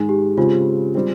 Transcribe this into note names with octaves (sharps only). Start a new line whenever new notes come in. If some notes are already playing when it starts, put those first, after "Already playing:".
Already playing: G#2 D#3 G#3 G#4
G4
C#3 G#3 C4 F4
G3 C4